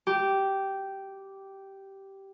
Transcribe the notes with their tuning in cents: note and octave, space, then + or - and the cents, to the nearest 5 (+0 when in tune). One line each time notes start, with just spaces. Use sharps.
G4 -10